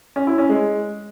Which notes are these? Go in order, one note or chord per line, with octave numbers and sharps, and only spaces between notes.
C#4
E4
C#4
G#3